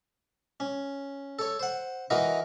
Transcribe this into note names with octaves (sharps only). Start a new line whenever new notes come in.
C#4
A4 C#5
C5 F#5
E3 D#4 F#4 A#4 D#5